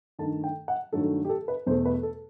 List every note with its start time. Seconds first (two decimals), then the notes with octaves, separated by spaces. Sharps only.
0.19 G2 D#3 A3 A5
0.44 G5
0.68 F#5
0.92 G2 D#3 F#3 A3 A4
1.25 G4
1.29 A4
1.48 B4
1.66 E2 B2 A3 C5
1.85 B4
2.03 A4